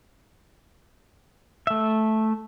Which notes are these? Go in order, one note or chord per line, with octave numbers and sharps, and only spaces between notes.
A3 E5